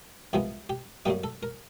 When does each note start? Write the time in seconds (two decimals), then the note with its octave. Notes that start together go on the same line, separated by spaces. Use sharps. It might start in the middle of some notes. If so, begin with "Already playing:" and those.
0.33 C2 C3 F3 G#3 B3 G4
0.69 G4
1.05 F#2 D3 G3 A#3 D#4 G4
1.24 A4
1.43 A#4